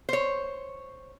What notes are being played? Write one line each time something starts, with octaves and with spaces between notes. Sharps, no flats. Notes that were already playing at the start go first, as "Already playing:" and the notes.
C5 C#5